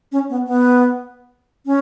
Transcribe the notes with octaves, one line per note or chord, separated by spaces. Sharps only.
C#4
B3
B3
C#4